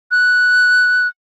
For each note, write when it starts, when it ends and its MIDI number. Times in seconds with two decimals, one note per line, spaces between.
0.11 1.07 90